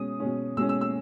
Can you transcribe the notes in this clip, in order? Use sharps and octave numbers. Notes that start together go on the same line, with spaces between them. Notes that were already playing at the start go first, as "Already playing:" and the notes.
Already playing: B2 G#3 C#4 D#6
B2 G#3 C#4
B2 G#3 C#4 E6
E6
E6